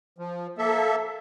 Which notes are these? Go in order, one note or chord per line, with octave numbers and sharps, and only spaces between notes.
F3
A#3 A4 E5